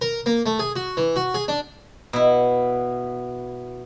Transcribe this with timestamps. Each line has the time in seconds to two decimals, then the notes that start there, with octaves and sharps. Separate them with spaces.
0.01 A#4
0.26 A#3
0.46 A3
0.59 G#4
0.76 F#4
0.97 E3
1.16 F#4
1.34 G#4
1.48 D4
2.13 B2 E4